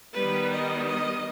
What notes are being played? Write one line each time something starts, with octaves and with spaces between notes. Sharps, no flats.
D#3 G3 B3 B4
D#5
D#5